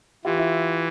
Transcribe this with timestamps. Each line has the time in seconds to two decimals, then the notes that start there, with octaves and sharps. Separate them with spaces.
0.25 E3 F4 G4
0.38 E4